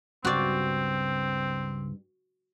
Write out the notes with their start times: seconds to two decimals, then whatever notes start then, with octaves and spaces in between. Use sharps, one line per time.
0.25 C#2 G2 C4 F#4 D5